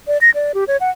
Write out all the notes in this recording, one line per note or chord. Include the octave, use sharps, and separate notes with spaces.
D5
A#6
D5
G4
C#5
F#5